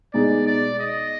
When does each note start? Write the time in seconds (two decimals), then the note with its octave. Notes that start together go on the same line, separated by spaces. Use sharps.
0.14 B2 G#3 D#4 G#4 D5
0.47 D5
0.80 D#5